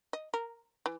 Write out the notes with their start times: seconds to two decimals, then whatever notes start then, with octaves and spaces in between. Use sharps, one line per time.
0.13 D#5
0.34 A#4
0.86 E3